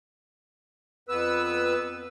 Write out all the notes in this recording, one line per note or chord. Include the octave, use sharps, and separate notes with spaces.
F2 B3 B4 E6